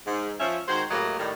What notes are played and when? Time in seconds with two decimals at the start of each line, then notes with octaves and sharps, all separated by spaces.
0.06 G#2
0.40 F3 C#4 E5
0.68 D#3 G#3 F#4 C5
0.90 A2 F#3 G#3 A#3 G4 D#5
1.18 A2 D#3 G3